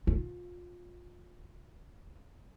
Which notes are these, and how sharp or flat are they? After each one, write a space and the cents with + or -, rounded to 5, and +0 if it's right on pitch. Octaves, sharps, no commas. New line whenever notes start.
F4 +25